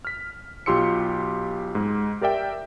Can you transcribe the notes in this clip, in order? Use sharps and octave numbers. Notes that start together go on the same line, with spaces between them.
F6 B6
B1 F4 G4 C6 E6 C#7
G#2 G#3
G4 A#4 D5 E5 G5